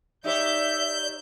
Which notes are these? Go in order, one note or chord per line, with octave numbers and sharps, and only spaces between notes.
D#4 G4 C#5 D5 E5 G6